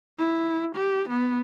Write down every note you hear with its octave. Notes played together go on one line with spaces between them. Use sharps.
E4
G4
B3